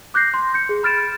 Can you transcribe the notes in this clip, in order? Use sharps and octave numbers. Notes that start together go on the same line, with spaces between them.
D6 F#6 G6 A#6 C7
C6
G6 C#7
G#4
B5 F6 A6 D7 E7